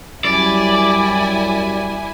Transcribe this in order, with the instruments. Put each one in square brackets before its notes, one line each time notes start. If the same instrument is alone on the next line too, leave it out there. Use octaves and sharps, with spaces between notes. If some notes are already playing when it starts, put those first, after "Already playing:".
[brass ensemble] F#2 G3 [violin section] E4 G#5 [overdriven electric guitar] D5